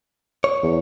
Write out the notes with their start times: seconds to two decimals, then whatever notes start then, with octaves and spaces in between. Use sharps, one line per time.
0.44 C#5
0.63 E2